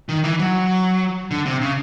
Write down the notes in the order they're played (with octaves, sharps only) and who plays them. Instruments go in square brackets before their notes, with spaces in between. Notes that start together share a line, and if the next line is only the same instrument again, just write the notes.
[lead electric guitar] D#3
E3
F#3
D3
C3
C#3